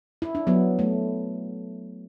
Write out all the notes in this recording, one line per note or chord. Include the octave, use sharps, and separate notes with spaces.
E4
D4
F#3 B3
A3